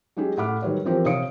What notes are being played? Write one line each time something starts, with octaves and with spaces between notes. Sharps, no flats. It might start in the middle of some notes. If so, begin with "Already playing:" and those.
F#3 G#3 C#4 G4 G#4
A2 A3 F#5 B5 D6 F6
D#3 F#3 G3 B4 C#5
E3 F3 C4 G4 A#4 C5
C3 C#5 F5 D#6 C#7 D7